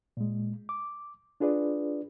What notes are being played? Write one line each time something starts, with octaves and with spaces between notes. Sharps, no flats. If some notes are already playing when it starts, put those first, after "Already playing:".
A#2 G#3
D6
D4 F4 G#4 B4 D5